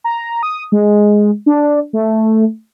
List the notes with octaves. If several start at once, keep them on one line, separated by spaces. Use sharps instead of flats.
A#5
D#6
G#3
D4
A3